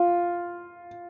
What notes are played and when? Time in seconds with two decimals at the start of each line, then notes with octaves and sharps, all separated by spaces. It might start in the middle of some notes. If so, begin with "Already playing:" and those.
Already playing: F4